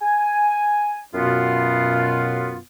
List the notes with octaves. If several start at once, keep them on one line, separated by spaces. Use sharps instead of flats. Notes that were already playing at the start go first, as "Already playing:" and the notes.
G#5
F#2 B2 B3 F4